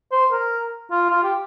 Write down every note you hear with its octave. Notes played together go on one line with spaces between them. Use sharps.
C5
A#4
F4
F4
G4